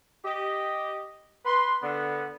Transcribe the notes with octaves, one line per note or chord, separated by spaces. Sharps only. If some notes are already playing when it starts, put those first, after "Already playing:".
G4 D#5
B4 C6
D3 B3